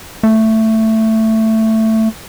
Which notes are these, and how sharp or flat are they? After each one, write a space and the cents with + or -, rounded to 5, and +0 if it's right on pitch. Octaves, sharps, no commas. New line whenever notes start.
A3 +10